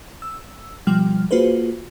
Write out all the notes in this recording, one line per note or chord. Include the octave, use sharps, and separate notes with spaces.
E6
B2 F3 G3 G5 F6
A#3 F4 F#4 G#4 B4 C5